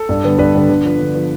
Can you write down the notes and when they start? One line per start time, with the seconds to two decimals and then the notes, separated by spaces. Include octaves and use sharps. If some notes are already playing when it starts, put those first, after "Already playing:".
Already playing: A4
0.09 G2
0.24 D3 G3 B3
0.38 G2 B4
0.55 D3 G3 B3
0.69 D3
0.84 F3 B3
0.99 D3
1.15 F3 B3